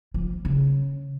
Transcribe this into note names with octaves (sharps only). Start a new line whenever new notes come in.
F3
C#3